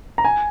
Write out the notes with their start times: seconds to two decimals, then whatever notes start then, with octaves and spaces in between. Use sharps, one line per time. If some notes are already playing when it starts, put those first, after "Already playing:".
0.18 A#5
0.25 G#5